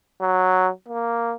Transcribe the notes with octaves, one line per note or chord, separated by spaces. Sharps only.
F#3
A#3